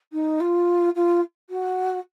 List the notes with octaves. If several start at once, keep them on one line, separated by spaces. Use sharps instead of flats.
D#4
F4
F4
F#4